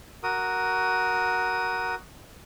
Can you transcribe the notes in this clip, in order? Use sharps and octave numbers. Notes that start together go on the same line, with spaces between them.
F#4 A#4 D#6